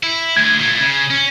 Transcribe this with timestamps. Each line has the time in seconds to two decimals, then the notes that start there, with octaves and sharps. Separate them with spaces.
0.03 E4
0.36 D2 G#6
0.59 A#2 A3
0.80 C#3
1.11 C#4